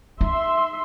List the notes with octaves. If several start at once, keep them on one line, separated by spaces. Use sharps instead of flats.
D#4 E5 C6